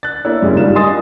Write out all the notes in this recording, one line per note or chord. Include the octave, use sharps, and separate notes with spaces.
F#6 A6
A#3 D4 E4 C#5
F#2 C#3 G3 G#3 E4
G#1 G2 G3 F4 E7
A#4 D#5 G#5 C6 D#6 A6